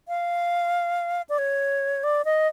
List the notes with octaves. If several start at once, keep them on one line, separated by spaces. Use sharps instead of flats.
F5
D5
C#5
D5
D#5